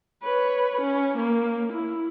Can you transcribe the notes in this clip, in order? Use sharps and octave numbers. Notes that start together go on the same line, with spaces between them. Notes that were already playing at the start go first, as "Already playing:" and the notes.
B4 C#5
C#4
A#3
E4